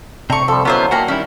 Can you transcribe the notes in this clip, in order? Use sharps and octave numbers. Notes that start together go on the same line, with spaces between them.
C3 A3 D4 A#5 C#6
F3 G3 A4
D3 F#3 B3 C#4 E4 F4 C5
A#3 D4 E4 F#4 F5 G5 G#5 A#5
D#3 G3 C#4 E4 E6